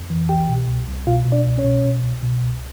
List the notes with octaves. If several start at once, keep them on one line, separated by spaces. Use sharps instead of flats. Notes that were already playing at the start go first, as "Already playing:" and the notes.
Already playing: F2
E3
C2 G4 G5
B2
C2
C2
B2 F4 F5
B2
D4 D5
C2
C#4 C#5
B2
B2
C2
B2
C2